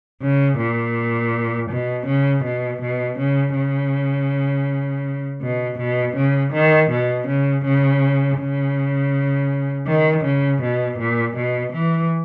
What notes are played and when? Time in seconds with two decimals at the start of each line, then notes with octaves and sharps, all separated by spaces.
0.22 C#3
0.58 A#2
1.70 B2
2.07 C#3
2.44 B2
2.82 B2
3.18 C#3
3.56 C#3
5.42 B2
5.78 B2
6.16 C#3
6.53 D#3
6.91 B2
7.27 C#3
7.65 C#3
8.38 C#3
9.87 D#3
10.24 C#3
10.62 B2
10.99 A#2
11.36 B2
11.73 E3